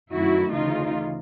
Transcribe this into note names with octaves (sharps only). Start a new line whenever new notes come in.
F#2 D#3 F#3 A3 E4 F#4
D2 C#3 E3 D#4 F4